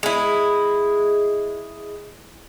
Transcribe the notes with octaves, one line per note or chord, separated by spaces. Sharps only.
G#3 E4